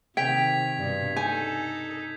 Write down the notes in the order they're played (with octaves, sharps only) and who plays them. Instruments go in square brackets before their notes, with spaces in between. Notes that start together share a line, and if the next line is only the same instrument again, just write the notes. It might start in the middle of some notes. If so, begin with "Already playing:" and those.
[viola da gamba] C3 D#3 [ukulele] G5 [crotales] G#6 B6 F7
[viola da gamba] G2 B2
[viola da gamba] D#4 A4 [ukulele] G#5 [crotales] G6